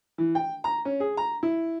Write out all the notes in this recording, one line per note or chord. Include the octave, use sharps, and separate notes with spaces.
E3
G5
A#5
C#4
G#4
A#5
E4